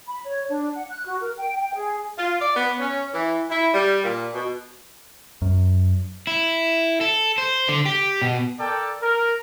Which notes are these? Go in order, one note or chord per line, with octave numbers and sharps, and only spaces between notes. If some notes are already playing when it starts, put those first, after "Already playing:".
B5
C#5
D4
F#5
F#6
F#4
A#4
G5
G5
G#4
F4
D5
B3
C#4
E3
E4
G3
A#2
B2
F#2
E4
A4
C5
D3
G4
B2
A4 A#4 D5 G5 A5
A#4